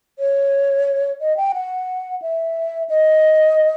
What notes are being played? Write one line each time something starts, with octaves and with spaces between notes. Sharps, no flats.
C#5
D#5
G5
F#5
E5
D#5